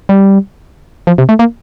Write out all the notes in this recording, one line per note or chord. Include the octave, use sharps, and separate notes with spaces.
G3
F3
C3
A3
A#3